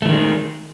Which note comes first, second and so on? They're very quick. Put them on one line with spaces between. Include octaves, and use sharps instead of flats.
A3 E3 D#3 G#3